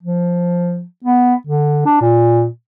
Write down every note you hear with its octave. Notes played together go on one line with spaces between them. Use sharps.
F3
B3
D3
D4
A#2